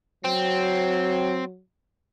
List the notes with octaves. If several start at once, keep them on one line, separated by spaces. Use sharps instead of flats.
F#3 C4